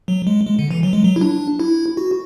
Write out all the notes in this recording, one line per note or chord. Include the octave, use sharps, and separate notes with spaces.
F#3
G#3
G#3
D3
E3
F#3
G#3
F#3
E4
D4
E4
F#4